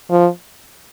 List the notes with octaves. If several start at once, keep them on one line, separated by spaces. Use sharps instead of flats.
F3